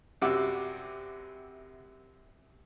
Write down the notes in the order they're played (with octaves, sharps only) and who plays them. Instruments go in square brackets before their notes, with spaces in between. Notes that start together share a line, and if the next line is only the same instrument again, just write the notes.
[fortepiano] F#2 C3 G3 F#4 D6 E6